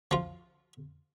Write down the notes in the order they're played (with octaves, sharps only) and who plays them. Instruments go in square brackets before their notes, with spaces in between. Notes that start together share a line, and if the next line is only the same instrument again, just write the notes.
[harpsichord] F3 F4